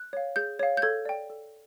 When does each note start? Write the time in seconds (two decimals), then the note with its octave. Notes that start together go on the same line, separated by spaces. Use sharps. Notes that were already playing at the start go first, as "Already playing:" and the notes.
Already playing: F#6
0.13 C#5 F5
0.36 G#4 G6
0.59 C#5 F5
0.77 G6
0.82 A4 G#6
1.05 D5 G5
1.30 A4